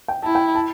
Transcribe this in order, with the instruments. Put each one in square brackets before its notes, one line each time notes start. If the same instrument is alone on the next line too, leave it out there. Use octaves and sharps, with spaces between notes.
[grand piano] G5
[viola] E4 [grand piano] A5
[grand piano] G5
A5